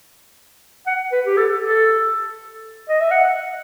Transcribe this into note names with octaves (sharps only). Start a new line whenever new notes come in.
F#5
B4
G4
A4
A4
D#5
E5
F#5